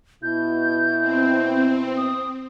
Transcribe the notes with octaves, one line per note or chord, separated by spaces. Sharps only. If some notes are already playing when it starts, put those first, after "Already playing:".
B2 E4 G6
C4
D#6